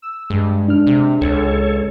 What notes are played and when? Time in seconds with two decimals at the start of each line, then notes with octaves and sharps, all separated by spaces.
0.02 E6
0.30 G2 G#3
0.68 D4 F6
0.87 C3
1.21 C#2 A4 C#5